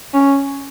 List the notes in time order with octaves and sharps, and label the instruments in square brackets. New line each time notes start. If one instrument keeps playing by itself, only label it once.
[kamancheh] C#4